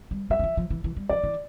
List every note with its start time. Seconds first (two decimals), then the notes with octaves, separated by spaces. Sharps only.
0.11 G3
0.30 G3 E5
0.39 E3
0.43 F3
0.57 F3
0.70 E3
0.84 E3
0.96 G3
1.09 F3 D5
1.24 E3